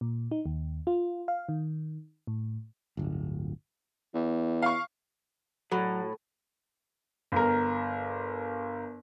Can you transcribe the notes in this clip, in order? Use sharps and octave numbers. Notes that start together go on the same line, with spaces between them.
A#2
D#4
D#2
F4
F5
D#3
A2
D1 G1
E2
F5 C#6
A2 F#3
G1 A#4